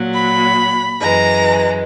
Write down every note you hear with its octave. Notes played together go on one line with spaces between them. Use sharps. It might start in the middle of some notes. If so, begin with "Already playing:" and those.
Already playing: A#2 F#3
B5
F#2 E3 G#3 A#5